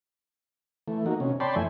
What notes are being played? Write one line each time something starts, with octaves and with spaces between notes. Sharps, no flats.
E3 A3
A#3 D#4 F#4
C3 C#4
C#5 D5 G5 A5 B5 C6
F2 E3 A3 E5 G#5